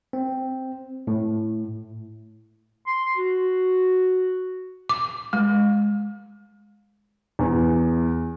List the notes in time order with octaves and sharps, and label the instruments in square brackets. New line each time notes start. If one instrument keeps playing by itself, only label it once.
[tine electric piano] C4
A2
[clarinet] C6
F#4
[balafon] D6
G#3
[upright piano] E2